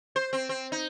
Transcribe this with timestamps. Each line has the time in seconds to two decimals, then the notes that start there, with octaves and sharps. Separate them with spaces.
0.16 C5
0.33 C4
0.49 C4
0.72 D#4